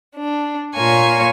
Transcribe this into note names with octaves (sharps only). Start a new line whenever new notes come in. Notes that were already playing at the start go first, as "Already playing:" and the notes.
D4
A#2 F4 A#4 C#5 G#5 C#6